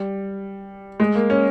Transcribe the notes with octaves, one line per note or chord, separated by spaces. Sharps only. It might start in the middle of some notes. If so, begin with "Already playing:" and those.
Already playing: G3
G#3
A#3
C#4